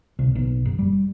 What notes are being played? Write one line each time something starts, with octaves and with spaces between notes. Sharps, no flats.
C2
B1
F#1
G3